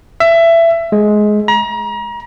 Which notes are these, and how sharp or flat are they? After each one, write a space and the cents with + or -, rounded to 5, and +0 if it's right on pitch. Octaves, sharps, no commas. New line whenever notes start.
E5 +20
G#3 +15
A#5 +35